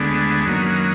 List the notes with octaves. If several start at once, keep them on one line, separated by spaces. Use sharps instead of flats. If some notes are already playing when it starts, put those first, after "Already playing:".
Already playing: D2 D3 G#3 B3
F#2 D#3 F#3 A#3